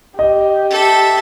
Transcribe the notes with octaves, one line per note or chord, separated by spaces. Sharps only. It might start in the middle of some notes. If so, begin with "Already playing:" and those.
G4 D#5
A4 E5